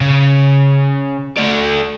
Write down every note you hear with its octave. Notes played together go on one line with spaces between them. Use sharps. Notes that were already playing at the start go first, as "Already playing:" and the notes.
C#3
A3 D5